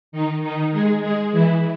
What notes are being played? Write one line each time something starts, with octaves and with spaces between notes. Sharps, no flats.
D#3 D#4
D#3 D#4
G#3 G#4
G#3 G#4
E3 E4